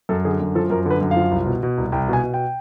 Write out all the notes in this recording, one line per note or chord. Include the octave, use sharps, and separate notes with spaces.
F#2 A4
D3 G#4
F#2
F3 A4
F#2 A#4
D3 B4
F#2
F5
F3
C2
B2
B2
C2
C2 G5
B2 G#5
B2
G5